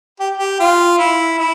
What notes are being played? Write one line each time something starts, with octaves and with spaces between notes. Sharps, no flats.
G4
G4
F4
E4
E4